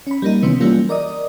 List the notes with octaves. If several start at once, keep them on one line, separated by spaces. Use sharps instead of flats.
C#4 B5
G3 A#3 D#4
C3 D#3 E3 B3 C#4
E3 F#3 G3 A#3 C#4 F4
A#4 D5 D#5 D#6